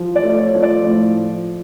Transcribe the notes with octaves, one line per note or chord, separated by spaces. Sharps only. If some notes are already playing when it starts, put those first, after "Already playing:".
Already playing: F3
D5
A3
C#5
F3
D5
A2